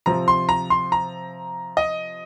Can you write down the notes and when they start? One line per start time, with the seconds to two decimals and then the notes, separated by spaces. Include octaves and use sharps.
0.06 C3 F3 C4 A#5
0.28 C6
0.49 A#5
0.70 C6
0.92 A#5
1.77 D#5